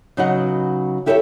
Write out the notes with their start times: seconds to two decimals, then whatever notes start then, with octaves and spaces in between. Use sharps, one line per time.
0.17 C#3 F#3 D#4 B4 D#5 F#5
1.06 E4 G4 A4 C#5 D5 E5